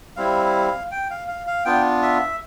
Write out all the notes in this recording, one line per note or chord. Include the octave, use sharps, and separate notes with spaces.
G3 C4 E4 F5
G5
F5
F5
F5
B3 D4 F4 G5
E5